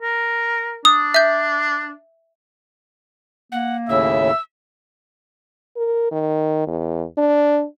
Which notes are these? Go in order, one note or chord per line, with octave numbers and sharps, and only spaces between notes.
A#4
D4 D#6
E5 G6
A#3 F#5
D#2 A2 C#3 E5 E6
A#4
D#3
E2
D4